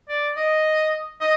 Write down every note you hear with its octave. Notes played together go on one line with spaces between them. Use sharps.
D5
D#5
D#5